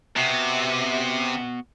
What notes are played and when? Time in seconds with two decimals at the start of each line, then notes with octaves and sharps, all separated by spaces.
0.16 C3 B3 F#4